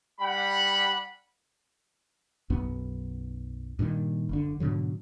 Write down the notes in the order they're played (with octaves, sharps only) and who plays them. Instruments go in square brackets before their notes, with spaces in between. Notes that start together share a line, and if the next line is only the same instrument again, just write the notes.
[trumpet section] G3 F#5 B5
[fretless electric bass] B1 F#2 B3
G2 A#2 D3 D#3
F#1 D3
G#2 B2 D3 F#3